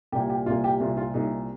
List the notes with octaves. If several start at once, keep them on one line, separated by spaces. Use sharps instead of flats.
C2 A#2 G4
G4
C2 A#2 F4
G4
C2 A#2 F4
F4
C2 A#2 D#4